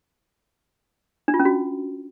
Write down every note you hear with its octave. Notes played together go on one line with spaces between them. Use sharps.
D4
F4
C#4
F#4